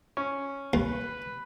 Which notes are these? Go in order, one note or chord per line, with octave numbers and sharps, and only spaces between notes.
C#4
D#2 B4